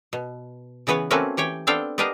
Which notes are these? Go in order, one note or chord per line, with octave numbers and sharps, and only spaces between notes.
B2
C#3 E3 B3 B4 C#5
A3 A#3 C4 C#4 F#4 B4
E3 G4 C#5 G5
B3 C4 D4 A4 F5 G5
B3 D4 G4 A#4 D#5 F5